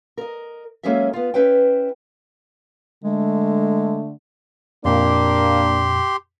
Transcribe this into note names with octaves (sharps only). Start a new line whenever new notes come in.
A#4 D#5
F#3 G#3 A#3 C#4 A4 E5
B3 F4
C#4 E4 B4 C5 G5
D3 G#3 A3
F2 A#2 A#3 D4 G4 C6